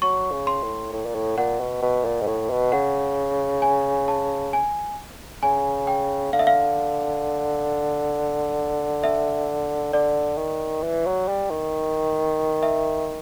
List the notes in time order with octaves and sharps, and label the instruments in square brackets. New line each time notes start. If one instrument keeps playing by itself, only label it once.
[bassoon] F#3 [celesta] C#6
[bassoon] C#3
[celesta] C6
[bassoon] A2
A2
A#2
A2
[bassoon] A#2 [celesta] F#5
[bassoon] B2
B2
A#2
G#2
A2
B2
[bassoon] C#3 [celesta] F#5
[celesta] G#5
A5
G#5
[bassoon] C#3 [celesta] G#5
[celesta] G5
[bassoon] D3 [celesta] F5
[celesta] E5
F5
E5
[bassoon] D3 [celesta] D5
[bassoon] D#3
E3
F#3
G3
D#3
[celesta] E5